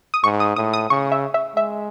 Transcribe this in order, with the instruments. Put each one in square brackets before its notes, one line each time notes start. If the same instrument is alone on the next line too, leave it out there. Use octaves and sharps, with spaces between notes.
[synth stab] D#6
[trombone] G#2 [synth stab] C#6
[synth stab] D#6
[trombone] A2 [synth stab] D#6
[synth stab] D#6
[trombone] C#3 [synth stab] C#6
[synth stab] E5
E5
[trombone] G#3 [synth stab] E5